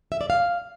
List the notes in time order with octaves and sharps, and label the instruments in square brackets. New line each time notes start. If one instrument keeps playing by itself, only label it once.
[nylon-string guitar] E5
D5
F5